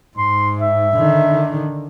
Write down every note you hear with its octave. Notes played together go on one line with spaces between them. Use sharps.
G#2 C6
E5
D3 D#3